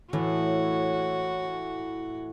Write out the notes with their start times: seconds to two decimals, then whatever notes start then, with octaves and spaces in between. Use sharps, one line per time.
0.13 A2 E3 F#4 C#5